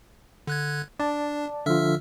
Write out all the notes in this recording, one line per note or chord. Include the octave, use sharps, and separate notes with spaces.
D3 F#6 G#6
D4 D5 A5
D3 F3 F4 E5 E6 F6